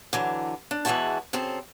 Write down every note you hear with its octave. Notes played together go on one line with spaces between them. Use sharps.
D3 E3 F#3
D4
E2 E3 G#3 E4 F#4 A5
F#2 C#3 C4 A4